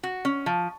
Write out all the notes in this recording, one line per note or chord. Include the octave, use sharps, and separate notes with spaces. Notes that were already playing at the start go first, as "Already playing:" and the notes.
F#4
C#4
F3